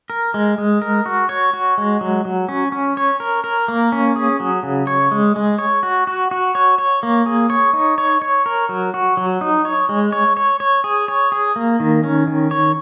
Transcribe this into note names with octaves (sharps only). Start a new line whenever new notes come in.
A#4
G#3
G#3
A#4
F#4
C#5
F#4
G#3
F#3
F#3
C#4
C#4
C#5
A#4
A#4
A#3
C#4
G#4
F#3
C#3
C#5
G#3
G#3
C#5
F#4
F#4
F#4
C#5
C#5
A#3
G#4
C#5
D#4
C#5
C#5
A#4
F#3
F#4
F#3
D#4
C#5
G#3
C#5
C#5
C#5
G#4
C#5
G#4
A#3
D#3
C#4
D#3
C#5